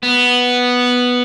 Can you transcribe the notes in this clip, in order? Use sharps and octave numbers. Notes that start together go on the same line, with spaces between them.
B3